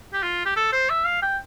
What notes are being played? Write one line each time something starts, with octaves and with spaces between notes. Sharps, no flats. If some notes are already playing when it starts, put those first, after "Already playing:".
G4
F4
G4
A4
C5
E5
F5
G5